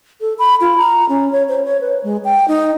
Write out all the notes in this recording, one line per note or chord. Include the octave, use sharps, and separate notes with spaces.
A4
B5
F4
A#5
C#4
C#5
C5
C#5
B4
G#3
G5
D#4